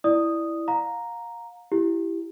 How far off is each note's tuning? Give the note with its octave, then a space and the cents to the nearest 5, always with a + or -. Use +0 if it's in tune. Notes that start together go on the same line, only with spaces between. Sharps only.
E4 +0 D5 +10 D#6 -5
F5 +30 A#5 +0
E4 +10 G4 +0